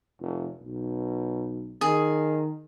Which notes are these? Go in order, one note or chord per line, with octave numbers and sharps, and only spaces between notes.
F1
B1
D#3 G#4